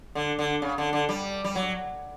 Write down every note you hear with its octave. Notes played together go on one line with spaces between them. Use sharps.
D3
D3
C#3
D3
D3
G3
G3
F#3